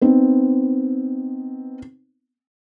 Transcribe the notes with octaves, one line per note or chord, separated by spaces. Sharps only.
B3 C4 D#4